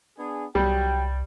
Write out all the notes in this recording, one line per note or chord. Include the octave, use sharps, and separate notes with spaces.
B3 D4 G#4
C2 F#3 G3 G5